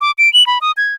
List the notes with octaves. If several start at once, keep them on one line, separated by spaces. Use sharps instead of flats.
D6
D7
F#7
B5
D#6
G#6